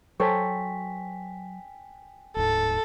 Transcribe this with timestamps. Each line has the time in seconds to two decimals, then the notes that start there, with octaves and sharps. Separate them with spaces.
0.20 F#3 A4 C5 C#5 G5 G#5 B6
2.36 D1 G#2 A4